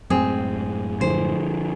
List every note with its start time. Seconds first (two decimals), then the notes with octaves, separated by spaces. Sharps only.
0.10 F#2 A2 G#3 C4 G#4
1.01 D3 F3 C5